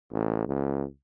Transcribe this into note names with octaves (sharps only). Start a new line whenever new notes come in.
A1
C#2